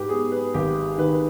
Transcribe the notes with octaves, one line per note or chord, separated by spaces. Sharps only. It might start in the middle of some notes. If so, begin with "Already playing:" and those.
Already playing: G#2 G4 B4
B3 G#4
B4
G#1 G4
D#3 B4